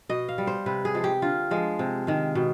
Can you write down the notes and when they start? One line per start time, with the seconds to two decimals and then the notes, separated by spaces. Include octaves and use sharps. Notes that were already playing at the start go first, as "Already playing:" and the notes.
0.09 B2 D#5
0.29 F5
0.38 G3
0.47 C5
0.66 C3 B4
0.85 G#4
0.94 F3 G#3
1.04 G4
1.22 D3 F4
1.51 F3 G#3
1.79 C3
2.07 D#3 G#3
2.35 B2